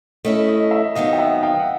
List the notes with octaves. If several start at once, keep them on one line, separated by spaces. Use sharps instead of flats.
A3 C#4 E4 D#5
D#5
E5
C3 D#3 F#3 B3 D#5 F5
G5
E5 F#5
F5 G5
F#5